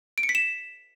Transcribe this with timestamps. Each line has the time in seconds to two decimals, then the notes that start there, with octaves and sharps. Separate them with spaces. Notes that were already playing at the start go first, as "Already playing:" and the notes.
0.18 D7
0.23 C#7
0.29 B6
0.35 E7